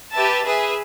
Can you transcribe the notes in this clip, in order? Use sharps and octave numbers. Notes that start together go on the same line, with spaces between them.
G4 B4 E5 A5
G#4 B4 E5